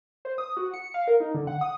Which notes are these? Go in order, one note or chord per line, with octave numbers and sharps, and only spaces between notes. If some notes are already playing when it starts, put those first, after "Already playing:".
C5
D#6
F#4
C#7
F5
A#4
D#4
D3
F#5
D#6